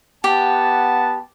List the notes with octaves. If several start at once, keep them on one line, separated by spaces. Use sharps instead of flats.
B3 G4 F#5 A5